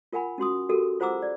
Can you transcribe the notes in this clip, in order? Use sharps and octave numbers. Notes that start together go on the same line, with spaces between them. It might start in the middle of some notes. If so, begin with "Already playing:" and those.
F4 A#4 F#5 G#5 B5
C#4 F#4 C6 D#6
F#4 G4 A4 A#4
F4 C5 F#5 A#5 D6 E6
D5